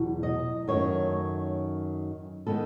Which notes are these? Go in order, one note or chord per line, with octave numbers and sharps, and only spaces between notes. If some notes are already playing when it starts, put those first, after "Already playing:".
Already playing: E2 B2 F#3
D#5
F#2 D#3 A3 C#5
D#3 G#3 B3 A4